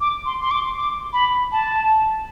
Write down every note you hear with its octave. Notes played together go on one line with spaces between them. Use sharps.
D6
C6
C6
D6
D6
B5
A5